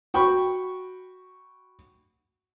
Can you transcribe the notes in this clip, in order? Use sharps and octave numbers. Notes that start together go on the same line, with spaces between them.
F#4 G5 B5 C#6